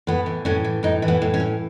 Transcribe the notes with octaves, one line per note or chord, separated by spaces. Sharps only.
A2 B3
E3
A2 C#4
E3
A2 D#4
E3
B3
A2
C#4
E3